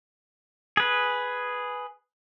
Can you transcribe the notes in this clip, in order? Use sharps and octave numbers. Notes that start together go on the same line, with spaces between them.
G#4 B4